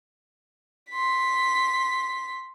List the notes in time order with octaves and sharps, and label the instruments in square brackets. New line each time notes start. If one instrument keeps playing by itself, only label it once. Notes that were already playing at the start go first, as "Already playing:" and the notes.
[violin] C6 B6